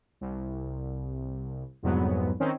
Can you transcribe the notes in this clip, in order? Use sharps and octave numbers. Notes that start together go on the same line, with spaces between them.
C2
C2 F2 G#2 F#3 B3
D#3 C4 C#4 D#4